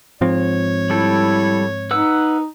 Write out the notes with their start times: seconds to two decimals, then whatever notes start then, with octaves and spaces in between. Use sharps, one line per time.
0.21 G#2 F3 C4 C#5
0.90 G3 E4 A4
1.91 D#4 B4 F#5 E6